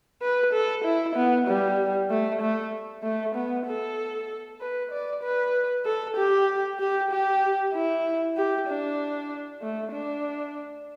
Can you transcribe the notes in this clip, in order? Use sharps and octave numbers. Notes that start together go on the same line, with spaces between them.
B4
A4
E4
B3
G3
A3
A3
A3
B3
A4
B4
D5
B4
A4
G4
G4
G4
E4
G4
D4
A3
D4